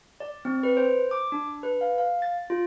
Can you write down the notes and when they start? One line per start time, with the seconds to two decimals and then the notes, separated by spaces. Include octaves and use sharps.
0.20 D5
0.45 C4
0.63 B4
0.77 C5
1.11 D6
1.32 D4
1.63 B4
1.81 F5
1.98 F5
2.22 A6
2.50 F4